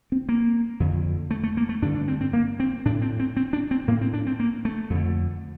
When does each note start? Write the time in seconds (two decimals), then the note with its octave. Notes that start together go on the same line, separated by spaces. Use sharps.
0.12 C4
0.29 A#3
0.80 F2 D3
1.31 A3
1.43 A3
1.57 A#3
1.69 A3
1.82 G2 D3 D4
1.95 D4
2.08 C4
2.21 C4
2.33 A#3
2.60 C4
2.85 A2 D4
3.02 C4
3.19 C4
3.37 C4
3.53 D4
3.71 C4
3.88 A2 A#3
4.01 C4
4.13 D4
4.27 C4
4.40 A#3
4.65 A3
4.90 F2 D3